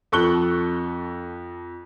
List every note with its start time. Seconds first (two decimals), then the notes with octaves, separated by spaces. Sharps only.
0.12 F2 A4 C#6 F#6 G7